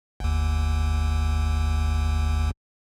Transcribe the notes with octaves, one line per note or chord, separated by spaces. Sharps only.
G1 D#2